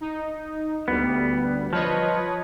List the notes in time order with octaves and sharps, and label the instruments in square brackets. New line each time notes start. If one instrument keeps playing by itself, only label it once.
[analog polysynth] D#4
[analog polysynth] D2 G3 [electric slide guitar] B3
[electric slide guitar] F3 [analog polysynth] B4 C#5 D#5